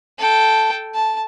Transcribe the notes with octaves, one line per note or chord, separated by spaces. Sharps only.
A4 G5
A5